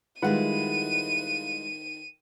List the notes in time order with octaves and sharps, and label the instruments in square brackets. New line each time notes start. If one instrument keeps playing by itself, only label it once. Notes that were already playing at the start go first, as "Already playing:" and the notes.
[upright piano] D#3 [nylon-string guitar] G3 G#3 E4 [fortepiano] F4 B4 F#5 [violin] D#7